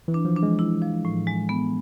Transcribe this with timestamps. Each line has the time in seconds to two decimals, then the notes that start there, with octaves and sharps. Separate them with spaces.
0.08 E3
0.14 D4
0.25 F3
0.37 D4
0.43 G#3
0.59 E4
0.82 F3
1.05 A2
1.27 G#3
1.49 B3